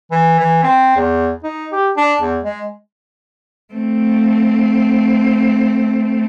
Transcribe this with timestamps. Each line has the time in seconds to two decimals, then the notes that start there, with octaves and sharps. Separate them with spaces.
0.11 E3
0.39 E3
0.63 C4
0.96 E2
1.44 D#4
1.72 G4
1.97 D4
2.21 E2
2.44 G#3
3.74 A3 C4